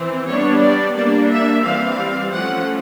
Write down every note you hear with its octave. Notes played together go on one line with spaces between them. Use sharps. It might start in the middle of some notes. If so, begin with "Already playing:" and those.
Already playing: E3 C4
G3 B3 D4 C#5
D5
G3 A#3 D4 D5
E5
E3 G3 C4 F5
F3 A3 C#4 F#5